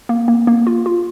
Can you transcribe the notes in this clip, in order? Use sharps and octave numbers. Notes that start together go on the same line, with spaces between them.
A#3
A#3
A#3
F4
F4